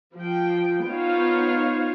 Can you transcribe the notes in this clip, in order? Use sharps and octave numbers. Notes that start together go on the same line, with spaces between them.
F3 G5
B3 D#4 F4 C5 C#5 F5